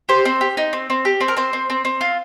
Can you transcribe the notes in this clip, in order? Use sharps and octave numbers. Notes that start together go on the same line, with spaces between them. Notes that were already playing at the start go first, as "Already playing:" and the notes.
G4 C5
C4
G4
D#4
C4
C4
G4
C4
A#4
C4 C5
C4
C4
C4
F4